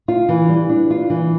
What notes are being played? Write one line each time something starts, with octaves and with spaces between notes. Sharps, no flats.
F4
E3
G3
D4
F4
E3